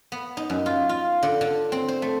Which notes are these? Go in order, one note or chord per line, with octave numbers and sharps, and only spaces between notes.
B3
D#4
F#2
F4
F4
D3
D3
C4
C5
A3